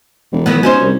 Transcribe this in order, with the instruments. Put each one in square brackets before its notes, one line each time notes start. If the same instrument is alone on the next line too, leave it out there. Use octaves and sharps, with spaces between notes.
[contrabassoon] E1
[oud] D#3 F#3 B3
[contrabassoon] B2 [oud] C#4 D#4 C5
[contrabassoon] C2